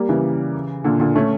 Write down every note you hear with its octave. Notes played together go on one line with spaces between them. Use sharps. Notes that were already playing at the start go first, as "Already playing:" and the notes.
Already playing: G3 A#3
C#3 E3
A#2 D3
A#2 D3
A3 C#4